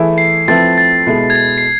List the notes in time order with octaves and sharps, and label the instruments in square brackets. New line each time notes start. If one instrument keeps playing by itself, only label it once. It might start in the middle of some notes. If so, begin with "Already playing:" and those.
Already playing: [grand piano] E3 A3 E4 G#4
[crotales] C7
[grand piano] F3 A3 C4 E4 B4 [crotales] A6
[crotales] A6
[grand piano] B2 G#3 B3 E4 A4
[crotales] G#6
A6
C7